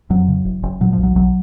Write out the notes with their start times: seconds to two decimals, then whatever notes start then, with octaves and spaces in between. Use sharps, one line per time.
0.10 F2 F#3
0.28 C#3
0.45 F#1
0.63 F#1
0.81 A#2 F#3
0.93 B1 F3
1.03 F#3
1.16 B1 F#3